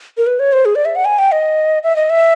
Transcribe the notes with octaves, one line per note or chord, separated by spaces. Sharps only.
A#4
B4
C#5
C5
G#4
D5
E5
F#5
G#5
G5
D#5
E5
D#5
E5